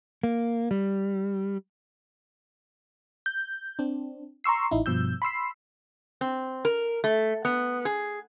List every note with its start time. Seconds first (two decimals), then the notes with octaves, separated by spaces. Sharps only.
0.23 A#3
0.71 G3
3.26 G6
3.79 C4 D4
4.44 A#5 C6 C#6 E6 C7
4.71 A1 D#4 E4
4.86 G2 B2 F3 E6 G6
5.22 B5 C6 E6 C7
6.21 C4
6.65 A#4
7.04 A3
7.45 B3
7.85 G#4